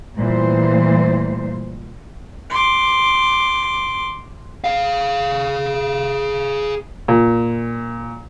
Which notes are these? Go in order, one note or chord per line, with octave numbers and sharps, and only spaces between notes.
A#2 E3 G3 A3 C5
C6 D6
G#4 F5
A#2